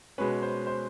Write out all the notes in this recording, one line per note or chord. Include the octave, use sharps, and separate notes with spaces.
B2 G#3 C#4 B4
C5
C5